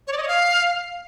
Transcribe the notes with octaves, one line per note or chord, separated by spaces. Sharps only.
C#5
D5
D#5
C#5
F5